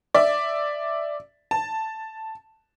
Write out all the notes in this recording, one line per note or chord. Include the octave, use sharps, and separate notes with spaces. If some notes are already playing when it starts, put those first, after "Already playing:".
D5 E5
A5